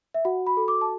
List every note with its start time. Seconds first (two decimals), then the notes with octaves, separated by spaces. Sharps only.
0.14 E5
0.25 F#4 F#5
0.47 B5
0.57 A4
0.68 D6
0.81 A5